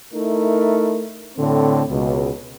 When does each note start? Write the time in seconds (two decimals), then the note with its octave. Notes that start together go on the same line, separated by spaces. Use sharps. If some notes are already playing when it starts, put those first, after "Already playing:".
0.13 A3 D#4 E4 A#4
1.37 A2 D3 C4
1.89 C#2 B2